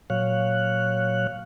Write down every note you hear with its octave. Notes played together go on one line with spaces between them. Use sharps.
A#2 F#3 C#5 F5 F#6